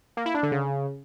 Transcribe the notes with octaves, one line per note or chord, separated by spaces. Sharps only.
A#3
E4
D4
D3
C#3